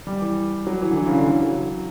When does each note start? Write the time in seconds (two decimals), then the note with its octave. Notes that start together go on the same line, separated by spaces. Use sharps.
0.07 G3
0.21 E3
0.67 F#3
0.82 E3
0.90 D3
0.97 E3
1.07 C#3
1.17 D3
1.27 E3
1.42 F#3